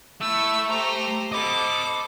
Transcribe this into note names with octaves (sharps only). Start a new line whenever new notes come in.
A3 E4 E5 E6
G4 C5 A#5
A4 C5 D#5 B5 D6